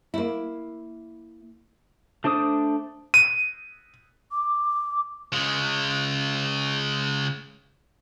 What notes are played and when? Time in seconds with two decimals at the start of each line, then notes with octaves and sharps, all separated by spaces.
0.14 A#3 E4
2.24 A3 D4 C5 D6 D#6
3.14 D#7
4.32 D6
5.33 C#3 G#3